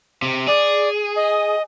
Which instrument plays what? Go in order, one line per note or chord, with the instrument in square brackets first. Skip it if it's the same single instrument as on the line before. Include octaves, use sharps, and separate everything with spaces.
[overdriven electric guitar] C3
[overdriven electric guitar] G#4 [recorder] D5
[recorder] D#5